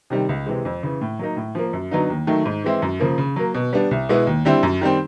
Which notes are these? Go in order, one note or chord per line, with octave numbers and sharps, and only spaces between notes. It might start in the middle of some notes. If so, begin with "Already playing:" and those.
C3 D#3 G3
C#2
C3 E3 G#3
F2
C#3 E3
A2
F#3 A#3 D#4
A2
F3 A#3
F#2
D3 F#3 B3 D#4
D#2
D#3 F#3 A3
G#2
E3 G#3 C4 E4
F#2
C#3 F3 A#3
C#3
F#3 A#3
B2
G3 B3 D4
C2
B2 G#3 B3 E4
D#2
D3 G3 C4 E4
F#2
D#3 G3 C4